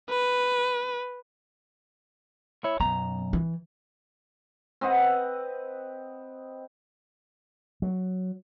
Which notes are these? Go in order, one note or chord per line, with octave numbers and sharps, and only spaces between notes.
B4
E4 C#5
B1 F#2 B3 A#5
E3
C4 B4 D#5 F#5
F#3